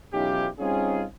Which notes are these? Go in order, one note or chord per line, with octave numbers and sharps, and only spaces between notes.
B1 E3 C#4 D#4 F4 G4
G3 C4 C#4 D#4 F4 G#4